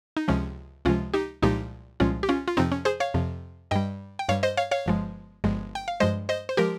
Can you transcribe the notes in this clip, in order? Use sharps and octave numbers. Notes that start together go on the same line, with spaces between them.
D#4
C#2 C3 F3 G#3 C#4
C#2 C3 F3 G#3 C#4 F4
D#4 G4
C2 A#2 F3 G#3 D#4 G4
C2 A#2 F3 G#3 C#4 F4
G4
C#4 F4
F4
F2 C3 F3 C4 D#4
C#4
G#4 C5
C#5 F5
F2 C3 F3
G2 G3 D#5 G5
G5
G2 G3 C#5 F5
C5 D#5
C#5 F5
C#5 F5
G1 G2 F3 G#3
G1 G2 F3 G#3
G5
F5
G2 F3 G#3 C5 D#5
C5 D#5
C5
F3 G#3 G4 A#4